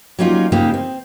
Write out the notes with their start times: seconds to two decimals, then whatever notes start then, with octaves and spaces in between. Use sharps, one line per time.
0.19 F#3 G3 A#3 C#4 D#4 F4
0.52 C#3 F3 G#3 A#3 D#4 G4
0.74 C4